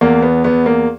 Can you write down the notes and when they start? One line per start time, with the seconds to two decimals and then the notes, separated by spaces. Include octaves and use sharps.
0.01 E2 A#3
0.22 B3
0.44 E2 B3
0.66 A#3